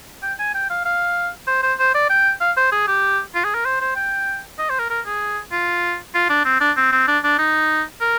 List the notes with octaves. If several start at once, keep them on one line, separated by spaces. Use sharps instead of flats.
G5
G#5
G5
F5
F5
C5
C5
C5
D5
G5
F5
C5
G#4
G4
F4
G#4
A#4
C5
C5
G5
D#5
C5
A#4
A#4
G#4
F4
F4
D4
C4
D4
C4
C4
D4
D4
D#4
A#4